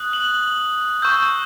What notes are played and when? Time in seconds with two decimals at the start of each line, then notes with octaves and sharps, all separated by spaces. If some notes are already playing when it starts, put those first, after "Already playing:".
Already playing: D#6 F#6
0.13 F#7
1.02 C#6 E6 G6